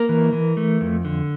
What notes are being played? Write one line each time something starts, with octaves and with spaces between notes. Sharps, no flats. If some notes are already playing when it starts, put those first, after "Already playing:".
Already playing: A#3 A#4
E3
E3
A3
F2
D3